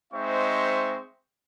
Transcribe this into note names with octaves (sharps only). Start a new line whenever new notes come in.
G#3 C4 D#4 C5 E5 C#6